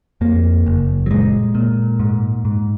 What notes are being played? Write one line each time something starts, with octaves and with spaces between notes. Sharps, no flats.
F2 A#3
F#1
F#3
A#2 G#3
A#2
G#2
G#2